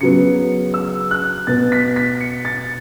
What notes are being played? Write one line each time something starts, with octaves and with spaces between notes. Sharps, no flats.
C#3 F#3 B3 C#7
E6
F#6
B2 B3 A6
B6
B6
C#7
A6